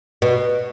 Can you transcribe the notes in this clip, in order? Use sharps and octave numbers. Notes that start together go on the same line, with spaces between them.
B2